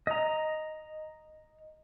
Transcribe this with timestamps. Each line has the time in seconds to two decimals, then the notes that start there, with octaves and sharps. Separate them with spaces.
0.07 D#5 A#5